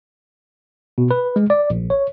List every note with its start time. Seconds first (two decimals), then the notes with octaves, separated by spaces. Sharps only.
0.98 B2
1.11 B4
1.36 G#3
1.50 D5
1.70 A#1
1.90 C#5